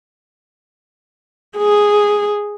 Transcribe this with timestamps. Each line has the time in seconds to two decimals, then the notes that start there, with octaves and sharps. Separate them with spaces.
1.57 G#4